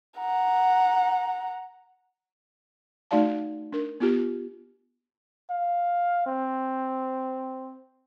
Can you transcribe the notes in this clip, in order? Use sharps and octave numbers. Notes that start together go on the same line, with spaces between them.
F#5 A#5
A3 D#4 F#4 D5 F5 A5
D4 A#4
B3 F4 G4
F5
C4